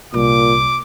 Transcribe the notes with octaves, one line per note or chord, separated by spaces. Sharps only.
C2 A#2 D6